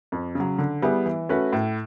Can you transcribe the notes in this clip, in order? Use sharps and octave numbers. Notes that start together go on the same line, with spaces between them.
F2
C#3 F#3
D3
G3 B3 E4 G#4
E3
A3 C#4 F#4 B4
A2